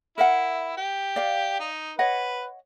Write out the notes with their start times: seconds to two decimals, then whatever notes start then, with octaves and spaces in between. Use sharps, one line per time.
0.18 E4 A#4 E5 F#5
0.77 G4
1.16 D5 F5
1.60 D#4
1.99 B4 C#5 D#5 F#5